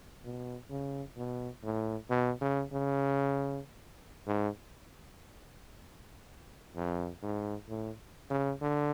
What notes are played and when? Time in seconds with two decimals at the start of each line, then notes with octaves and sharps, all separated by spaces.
0.25 B2
0.70 C#3
1.17 B2
1.64 A2
2.10 B2
2.41 C#3
2.73 C#3
4.27 G#2
6.76 F2
7.23 G#2
7.69 A2
8.30 C#3
8.62 D3